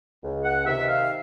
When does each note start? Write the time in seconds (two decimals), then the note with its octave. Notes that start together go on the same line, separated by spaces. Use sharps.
0.23 C#2
0.45 F#5
0.66 C3 D#3 E5
0.87 F5